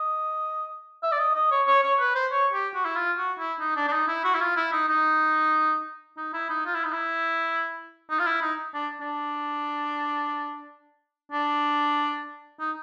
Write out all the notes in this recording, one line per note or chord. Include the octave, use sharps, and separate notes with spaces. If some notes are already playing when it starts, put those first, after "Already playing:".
Already playing: D#5
E5
D5
D#5
D#5
C#5
C#5
C#5
B4
C5
C#5
G4
F#4
E4
F4
F#4
E4
D#4
D4
D4
D#4
E4
F#4
E4
F4
E4
D#4
D#4
D#4
E4
D#4
F4
E4
D#4
E4
D#4
F4
E4
D#4
D4
D4
D4
D#4